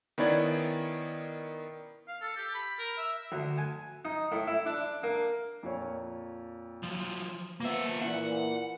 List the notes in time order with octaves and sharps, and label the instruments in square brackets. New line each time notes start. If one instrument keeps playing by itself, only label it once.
[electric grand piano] D#3 B3 C#4 E4 D5 G#6
[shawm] F5
A4
G4
B5
A#4
E5
[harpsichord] D2
G#5
D#4
A2
E4
D4
A#3
[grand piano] F2 A#2 C#5
[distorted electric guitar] F3 F#3
[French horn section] F3 B3 [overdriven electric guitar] A#3 E5
[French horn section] A#2 E3 [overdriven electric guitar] F#5